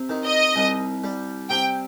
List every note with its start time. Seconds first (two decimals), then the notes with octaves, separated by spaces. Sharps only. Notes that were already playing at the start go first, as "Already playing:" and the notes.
Already playing: C3
0.09 D#3
0.25 D#5
0.56 C2
1.04 G3
1.50 C3 G5